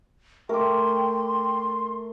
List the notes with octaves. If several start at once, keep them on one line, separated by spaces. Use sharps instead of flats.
A3 A#4 G5 C6 D6